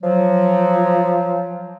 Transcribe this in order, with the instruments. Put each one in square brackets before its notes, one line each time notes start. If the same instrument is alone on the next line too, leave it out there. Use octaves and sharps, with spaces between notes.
[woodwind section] F3 F#3